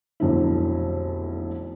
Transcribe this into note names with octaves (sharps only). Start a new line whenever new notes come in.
F1 B1 D3 F#3 E4